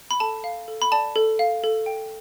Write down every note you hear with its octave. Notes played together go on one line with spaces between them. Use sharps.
B5
A4 A5
F5
A4
B5
D5 A5
A4
F5
A4
G5